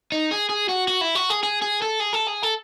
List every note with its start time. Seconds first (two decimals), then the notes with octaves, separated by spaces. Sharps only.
0.12 D#4
0.31 G#4
0.49 G#4
0.69 F#4
0.88 F#4
1.01 E4
1.15 F#4
1.30 G#4
1.43 G#4
1.62 G#4
1.82 A4
2.00 G#4
2.14 A4
2.28 G#4
2.43 A4